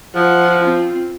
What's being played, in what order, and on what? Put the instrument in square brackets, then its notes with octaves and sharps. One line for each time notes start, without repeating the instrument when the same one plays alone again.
[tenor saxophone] F3 [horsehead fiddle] F4 F#5
[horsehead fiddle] C4 F4